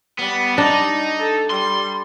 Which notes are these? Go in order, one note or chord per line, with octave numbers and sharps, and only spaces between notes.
G3 B3
D4 D#4
A4
G3 C6